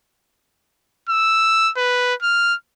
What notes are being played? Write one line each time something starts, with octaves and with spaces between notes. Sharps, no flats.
E6
B4
F6